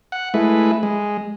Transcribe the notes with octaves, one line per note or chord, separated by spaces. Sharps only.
F#5
G#3 A3 E4 B4
G#3